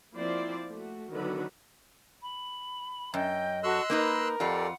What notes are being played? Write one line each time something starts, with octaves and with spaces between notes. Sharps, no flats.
F3 A#3 C4 E4 C5 D5
A3 F#4
D3 D#3 F#3 B3 F#4 B4
B5
F#2 D#5 G5
F#4 A4 C6 C#6 E6 F#6
A#3 D#4 A#4 B4
F2 F4 G4 A4 D5 F#5